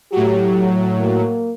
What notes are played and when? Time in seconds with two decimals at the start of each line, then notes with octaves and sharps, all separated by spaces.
0.12 A2 F#3 G4
1.00 A#3